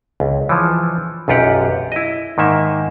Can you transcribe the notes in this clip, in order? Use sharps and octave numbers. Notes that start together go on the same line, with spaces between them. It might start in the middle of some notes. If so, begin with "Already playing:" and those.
C#2
E3 F3
B1 F#2 F4 G4 F#5
E4 D#5
G#2 D#3 A#3 E5